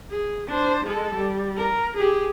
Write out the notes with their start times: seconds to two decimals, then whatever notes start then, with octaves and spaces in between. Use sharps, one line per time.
0.11 G#4
0.47 D4 C5
0.85 G#3 A4
1.15 G3
1.57 A#4
1.98 G4 G#4